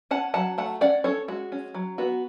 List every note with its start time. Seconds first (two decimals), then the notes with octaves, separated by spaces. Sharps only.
0.11 C#4 F#5 A5
0.34 F#3 F#5 A5
0.58 A3 F#5 A5
0.81 C#4 D5 F#5
1.04 C#4 A4 C#5
1.28 G#3 F#4
1.52 C#4
1.74 F#3
1.98 B3 F#4